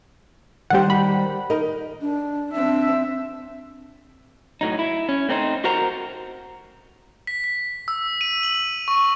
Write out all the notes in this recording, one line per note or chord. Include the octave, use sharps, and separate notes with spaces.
D#3 G3 G4 C5 F#5
B5
D#4 A#4 D#5
D4
C4 D4 E5
A2 F#3 D#4
E4
C#4
A3 C4 D4 D#4 C5
F#4 A#4 C5 F#5 A#5
B6
B6
E6
D#7
F#7
C#6